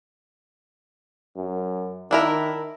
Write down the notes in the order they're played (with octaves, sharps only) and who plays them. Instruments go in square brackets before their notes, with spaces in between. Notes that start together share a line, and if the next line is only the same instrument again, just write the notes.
[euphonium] F#2
[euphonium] D#3 [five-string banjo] D4 E4 A#4